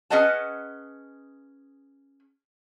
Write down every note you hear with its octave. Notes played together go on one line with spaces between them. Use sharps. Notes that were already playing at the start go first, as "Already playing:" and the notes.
C#4 G#4 B4 D#5 F#5 A5